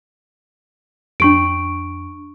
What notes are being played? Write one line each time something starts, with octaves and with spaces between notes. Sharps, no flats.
F2 D4 C#6 D7